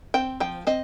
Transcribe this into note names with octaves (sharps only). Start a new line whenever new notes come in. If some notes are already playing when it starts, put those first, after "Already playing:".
C4 G5
F3 G5
C4 D#5